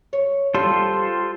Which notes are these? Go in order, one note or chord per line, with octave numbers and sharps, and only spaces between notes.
C#5
G3 F4 A4 C5